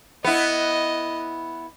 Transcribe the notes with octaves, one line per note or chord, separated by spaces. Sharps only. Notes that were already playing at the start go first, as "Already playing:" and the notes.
B3 E4 D#5